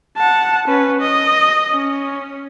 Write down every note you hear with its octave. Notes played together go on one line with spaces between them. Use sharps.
F#5 A5
C#4 B4
D#5
C#4